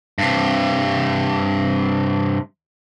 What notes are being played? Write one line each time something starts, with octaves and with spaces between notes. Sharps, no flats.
G2 C3